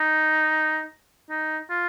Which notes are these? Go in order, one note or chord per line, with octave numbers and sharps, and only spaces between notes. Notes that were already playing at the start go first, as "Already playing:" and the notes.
Already playing: D#4
D#4
F4